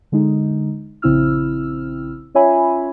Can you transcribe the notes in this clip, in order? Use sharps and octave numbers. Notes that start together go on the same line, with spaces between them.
D3 G#3 D#4
A#1 C#3 C4 E4 E6 F6
C#4 F4 C#5 E5 G#5 B5